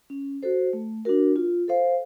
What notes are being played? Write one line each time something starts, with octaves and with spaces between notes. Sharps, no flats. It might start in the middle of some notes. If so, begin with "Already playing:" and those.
C#4
F#4 A4 C5
A3
D4 F#4 A#4
F4
A4 C5 F5